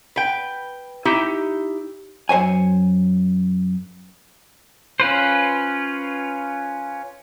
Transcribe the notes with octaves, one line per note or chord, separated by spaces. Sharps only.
B4 G5
D#4 E4 G4
F#2 C5 C#5 G#5
C#4 F4 B4 C5